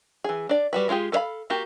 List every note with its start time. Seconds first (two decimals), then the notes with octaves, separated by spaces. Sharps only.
0.24 E3 G#4
0.49 D4 D5
0.73 G3 F#4 B4
0.89 G#3 F4 G4 G#4
1.12 A4 B4 C#5 F5 B5
1.50 A#3 F#4 G4